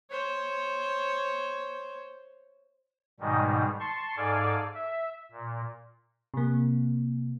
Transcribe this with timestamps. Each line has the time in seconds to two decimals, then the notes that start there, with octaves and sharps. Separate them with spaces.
0.11 C5 C#5
3.20 G#2 B2 D#3 G3 G#3 D#4
3.80 A5 C6 C#6
4.17 G#2 A4 D5 F5 G#5
4.75 E5
5.32 A#2
6.34 C3 A#3